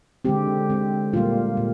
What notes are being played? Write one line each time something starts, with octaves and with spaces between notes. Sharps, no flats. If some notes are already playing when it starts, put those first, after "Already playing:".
D3 G#3 C4 G4
D3 G#3 C4
A#2 G3 A#3 F4
A#2